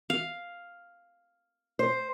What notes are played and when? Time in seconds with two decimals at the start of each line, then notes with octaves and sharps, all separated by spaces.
0.10 F5
1.79 C5